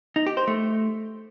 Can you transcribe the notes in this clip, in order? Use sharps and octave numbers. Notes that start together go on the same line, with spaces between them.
D#4
G4
C5
A3